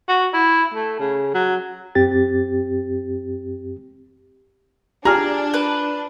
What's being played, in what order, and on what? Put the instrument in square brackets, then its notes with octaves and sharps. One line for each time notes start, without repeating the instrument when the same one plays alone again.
[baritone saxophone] F#4
E4
A3
C#3
F#3
[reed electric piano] F#2 C4 G4 A6
[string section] D4 [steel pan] F4 G4 [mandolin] G#4 [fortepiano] A#5 F6
[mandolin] B4